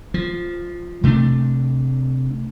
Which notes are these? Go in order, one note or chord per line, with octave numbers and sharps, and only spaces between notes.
F3
C3 A3 A#3 D4